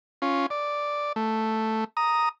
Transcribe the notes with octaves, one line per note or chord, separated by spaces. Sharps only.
C#4 F4
D5
A3
A#5 D#6